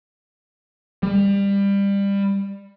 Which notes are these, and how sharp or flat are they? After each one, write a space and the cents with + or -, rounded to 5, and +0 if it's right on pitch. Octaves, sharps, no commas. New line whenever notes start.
G3 +25